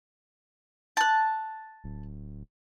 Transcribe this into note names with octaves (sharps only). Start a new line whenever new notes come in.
A5 F#6
D1